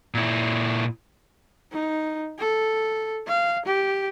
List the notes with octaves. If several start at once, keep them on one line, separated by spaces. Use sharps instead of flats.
A#2 E4
D#4
A4
F5
G4